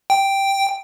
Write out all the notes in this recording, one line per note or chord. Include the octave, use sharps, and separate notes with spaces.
G5